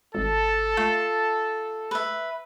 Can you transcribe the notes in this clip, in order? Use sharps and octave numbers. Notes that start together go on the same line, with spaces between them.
G#1 A4 A5
A3 F4
B4 E5